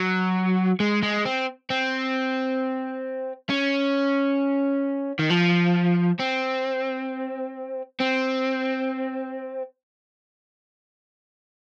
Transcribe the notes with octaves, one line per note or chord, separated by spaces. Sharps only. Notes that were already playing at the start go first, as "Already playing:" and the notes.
Already playing: F#3
G#3
G#3
C4
C4
C#4
D#3
F3
C4
C4